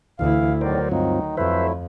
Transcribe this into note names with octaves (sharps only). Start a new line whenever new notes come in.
D2 E3 E4 F5
E2 A2 D#3 F#3 A#4 C5 D5
G2 D#3 C4 D#4 F4
F2 F#3 A3 E4 B4 C5 E5